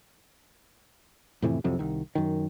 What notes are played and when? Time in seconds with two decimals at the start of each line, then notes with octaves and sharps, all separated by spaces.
1.42 F2 A2 C3 E3
1.64 C2 F2 C3 F#3
1.79 C2 D#3
2.15 F#2 D#3